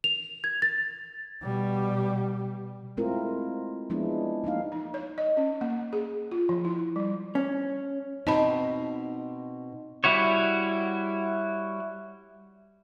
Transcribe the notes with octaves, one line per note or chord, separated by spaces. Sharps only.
F7
G#6
A6
B2 G3
G#3 A3 C4 E4 F4 A#4
F3 G#3 B3 D4 E4
F3 A#3 D#4 F5
D#4
C#5
D#5
C#4
A#3
G#4
F4
F3
E4
G3
C#4
B2 C4 D#4 D#5 A5 B5
G3 E4 F#4 C#5